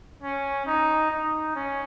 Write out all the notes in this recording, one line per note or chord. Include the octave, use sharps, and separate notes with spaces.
C#4
D#4
D#4
C#4